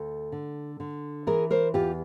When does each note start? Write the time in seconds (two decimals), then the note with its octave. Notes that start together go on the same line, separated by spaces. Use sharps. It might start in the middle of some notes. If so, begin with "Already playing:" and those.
Already playing: D2 A4
0.32 D3
0.80 D3
1.27 E3 G#4 A#4
1.51 A#4 C5
1.74 E2 F4 G4